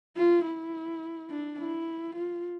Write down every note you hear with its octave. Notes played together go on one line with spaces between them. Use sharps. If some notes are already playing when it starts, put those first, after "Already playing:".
F4
E4
D4
E4
F4